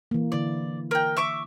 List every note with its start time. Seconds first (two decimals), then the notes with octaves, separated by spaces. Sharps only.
0.11 E3 A#3
0.32 D3 E4 D5
0.91 A#4 G5
1.17 E5 C#6 D6